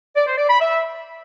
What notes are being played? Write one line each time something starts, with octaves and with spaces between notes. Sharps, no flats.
D5
C5
D5
B5
E5